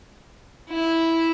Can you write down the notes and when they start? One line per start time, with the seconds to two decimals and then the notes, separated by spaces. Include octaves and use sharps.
0.70 E4